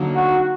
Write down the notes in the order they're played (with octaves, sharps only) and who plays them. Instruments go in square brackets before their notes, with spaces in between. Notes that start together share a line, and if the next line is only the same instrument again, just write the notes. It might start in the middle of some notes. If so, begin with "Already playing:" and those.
Already playing: [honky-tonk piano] D3 F#3 A#3 D#4
[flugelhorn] F#4